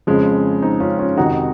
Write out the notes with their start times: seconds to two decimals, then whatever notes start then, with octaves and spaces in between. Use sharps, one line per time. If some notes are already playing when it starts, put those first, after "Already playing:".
0.07 F2 C#3 F3 G#3
0.62 C4 D#4
0.80 C#4 F4
0.99 C#4 F4
1.17 F2 C3 D#3 D#4 F#4